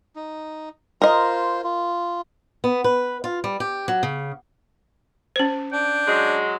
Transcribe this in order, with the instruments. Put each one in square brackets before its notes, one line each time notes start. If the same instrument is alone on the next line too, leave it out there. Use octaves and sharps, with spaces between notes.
[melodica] D#4
[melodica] F4 C5 [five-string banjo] A#4 D#5
[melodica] F4
[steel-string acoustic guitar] B3
B4
F4
G3
G4
F#3
C#3
[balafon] C#4 C5
[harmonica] D4 [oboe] G5
[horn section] F#3 G#3